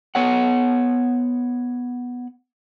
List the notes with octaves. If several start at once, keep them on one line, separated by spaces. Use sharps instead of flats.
B3 C#5 F#5